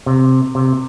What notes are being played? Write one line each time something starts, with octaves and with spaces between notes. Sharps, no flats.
C3
C3